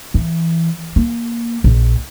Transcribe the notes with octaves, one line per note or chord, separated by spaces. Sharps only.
E3
A#3
A#1